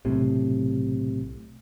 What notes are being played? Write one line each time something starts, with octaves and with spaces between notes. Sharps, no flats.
B1 A2 C3